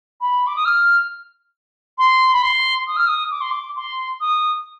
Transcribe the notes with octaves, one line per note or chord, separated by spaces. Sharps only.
B5
D6
D#6
F6
C6
B5
C6
D#6
F6
D#6
D6
C6
D6
C6
D#6